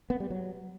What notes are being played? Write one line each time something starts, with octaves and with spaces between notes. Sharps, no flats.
B3
G3
F#3